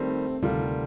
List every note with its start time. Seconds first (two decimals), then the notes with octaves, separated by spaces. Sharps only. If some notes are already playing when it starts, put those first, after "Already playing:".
Already playing: D#3 G3 A3 C4
0.43 D2 C3 D#3 G3 F4 A4